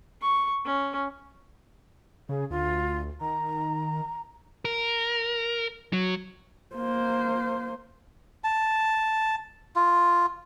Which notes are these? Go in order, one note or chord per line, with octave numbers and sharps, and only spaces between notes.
C#6
C#4
C#3 G#4
D2 F4
D#3 A#5
A#4
F#3
A#3 C5
A5
F4